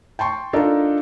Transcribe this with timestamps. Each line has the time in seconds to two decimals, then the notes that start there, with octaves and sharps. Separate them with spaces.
0.19 G5 A5 C6 C#6
0.53 D4 D#4 F4 A4 A#4